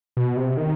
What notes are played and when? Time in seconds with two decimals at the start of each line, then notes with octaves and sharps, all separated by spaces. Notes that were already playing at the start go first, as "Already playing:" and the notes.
0.17 B2
0.37 C3
0.57 D#3